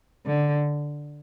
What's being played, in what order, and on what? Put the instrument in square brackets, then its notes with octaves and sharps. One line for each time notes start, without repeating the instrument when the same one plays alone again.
[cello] D3